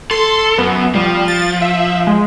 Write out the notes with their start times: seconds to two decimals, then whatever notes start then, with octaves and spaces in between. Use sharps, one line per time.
0.11 A4 C6
0.58 F#2 B3
0.95 F3 G3
1.28 A6
1.62 E5
2.07 G#3